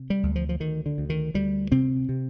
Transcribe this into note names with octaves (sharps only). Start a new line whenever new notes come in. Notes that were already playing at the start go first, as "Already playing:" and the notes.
Already playing: C3
G3
D2
F3
F3
D2 D#3
D3
D2
D#3
D2 G3
C3 C4
C3